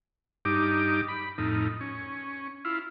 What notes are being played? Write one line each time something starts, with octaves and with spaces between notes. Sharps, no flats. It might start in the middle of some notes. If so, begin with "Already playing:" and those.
G2 D#4 G4 D6
B5
F2 A2 D#4
C#4
E4 F4